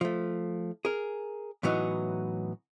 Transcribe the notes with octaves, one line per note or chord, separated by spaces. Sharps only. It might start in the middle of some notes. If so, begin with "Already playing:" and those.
F3 A3
G#4 A#4
A2 E3 F#3 B3 D#4 F#4